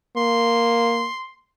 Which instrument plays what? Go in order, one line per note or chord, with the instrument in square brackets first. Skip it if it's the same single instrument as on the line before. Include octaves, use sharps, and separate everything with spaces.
[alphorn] A#3 [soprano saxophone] C6